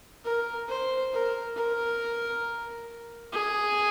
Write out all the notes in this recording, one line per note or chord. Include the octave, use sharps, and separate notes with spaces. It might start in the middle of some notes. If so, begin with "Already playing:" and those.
A#4
C5
A#4
A#4
G#4